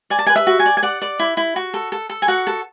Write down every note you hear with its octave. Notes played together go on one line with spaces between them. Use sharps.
D5 G#5
A5
B4 G#5
E5
F#4
G#5
D5
G#5
D5 F#5
D5
E4
E4
F#4
A4
A4
A4
G#5
F#4 F#5
A4